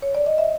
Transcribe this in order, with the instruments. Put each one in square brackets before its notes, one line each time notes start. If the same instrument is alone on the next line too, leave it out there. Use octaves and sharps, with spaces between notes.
[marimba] C#5
D5
D#5
E5